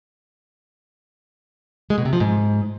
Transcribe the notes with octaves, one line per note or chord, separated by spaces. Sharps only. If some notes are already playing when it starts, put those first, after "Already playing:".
G#3
B2
C3
F3
G#2